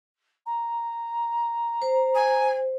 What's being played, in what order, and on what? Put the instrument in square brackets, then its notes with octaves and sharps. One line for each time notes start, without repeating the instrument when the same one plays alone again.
[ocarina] A#5
[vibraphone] C5
[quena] G#5